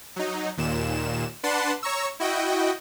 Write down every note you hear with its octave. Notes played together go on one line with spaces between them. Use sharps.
F#3 D#4
D#2 A#2 E7
D4 B4 F#5 A5 C6
C#5 A#5 C#6 E6
E4 F#4 D#5 G5